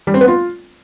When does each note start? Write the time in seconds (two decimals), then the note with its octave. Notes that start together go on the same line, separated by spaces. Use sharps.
0.07 G3
0.14 C4
0.21 B3
0.28 F4